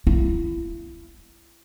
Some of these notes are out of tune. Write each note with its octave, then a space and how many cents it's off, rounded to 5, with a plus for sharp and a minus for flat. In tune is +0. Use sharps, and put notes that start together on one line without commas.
E4 +30